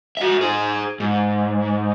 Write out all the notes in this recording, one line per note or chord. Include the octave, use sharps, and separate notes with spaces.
F#4 E5
G#4 C5
G#2